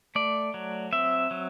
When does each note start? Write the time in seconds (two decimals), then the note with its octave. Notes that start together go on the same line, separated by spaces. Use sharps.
0.15 A3 D5
0.54 F#3
0.93 C4 E5
1.31 F#3